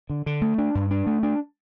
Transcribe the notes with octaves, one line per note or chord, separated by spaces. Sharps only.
D3
D3
A3
D4
G2
D4
A3
D4